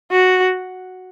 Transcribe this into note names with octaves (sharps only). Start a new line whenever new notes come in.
F#4